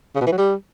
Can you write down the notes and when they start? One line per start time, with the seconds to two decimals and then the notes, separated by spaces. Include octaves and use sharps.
0.15 C#3
0.21 B2
0.26 E3
0.32 F#3
0.38 G3